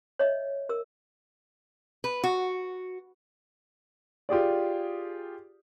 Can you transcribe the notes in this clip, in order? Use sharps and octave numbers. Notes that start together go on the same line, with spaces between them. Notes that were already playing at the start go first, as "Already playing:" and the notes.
C#5 D#5 E5
A#4 E6
B4
F#4
F4 G4 G#4 D5